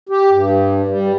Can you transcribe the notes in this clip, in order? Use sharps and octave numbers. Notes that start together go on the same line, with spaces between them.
G4
G2
G3